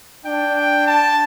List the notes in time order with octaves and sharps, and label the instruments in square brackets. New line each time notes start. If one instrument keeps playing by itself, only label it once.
[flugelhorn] D4 [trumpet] G5
[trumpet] G5
A5